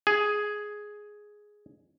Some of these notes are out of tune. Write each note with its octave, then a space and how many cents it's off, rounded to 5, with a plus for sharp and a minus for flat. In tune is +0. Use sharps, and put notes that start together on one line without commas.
G#4 +5